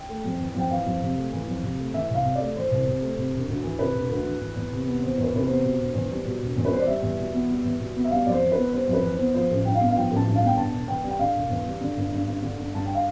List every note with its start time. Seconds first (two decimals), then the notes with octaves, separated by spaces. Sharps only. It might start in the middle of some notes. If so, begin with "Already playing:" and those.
Already playing: G5
0.09 A3
0.25 F2
0.40 E3
0.55 F2 G5
0.70 E3 F5
0.86 F2
1.02 C3
1.17 A3
1.32 E3
1.48 F2
1.63 C3
1.79 A3
1.93 E3 E5
2.10 C2 F5
2.25 C3
2.35 A3 D5
2.55 E3 C5
2.71 C2
2.87 C3
3.02 A3
3.17 C3
3.33 E1
3.48 D2
3.63 E3
3.79 C3 B4
3.94 E1
4.10 D2
4.25 E3
4.40 E3
4.56 E2
4.71 C3
4.87 B3
5.02 E3 C5
5.18 E2 B4
5.34 C3 B4
5.43 C5
5.49 B3
5.63 B2
5.79 E1
5.94 E2
6.11 G3
6.25 B2
6.41 E1
6.57 E2
6.65 B4
6.72 G3 C5
6.79 D5
6.87 G3 E5
7.02 E2
7.18 B2
7.33 B3
7.49 G3
7.64 E2
7.79 B2
7.95 B3
8.04 E5
8.10 G3 F5
8.26 F2 D5
8.31 C5
8.41 E3
8.52 B4
8.57 B3
8.72 G3 C5
8.88 F2
8.93 B4
9.03 E3
9.13 C5
9.19 B3
9.34 F3 C5
9.50 A1
9.64 G2 G5
9.75 F5
9.80 B3
9.90 F5
9.96 F3 G5
10.11 A1
10.16 A5
10.26 G2
10.36 F5
10.42 B3 G5
10.57 D3 A5
10.73 E1
10.88 E2 G5
11.03 G3
11.09 G5
11.19 D3 F5
11.35 E1
11.50 E2
11.66 G3
11.81 D3
11.96 G1
12.11 G2
12.27 G1
12.42 D3
12.57 G1
12.73 G2 A5
12.86 G5
12.95 F5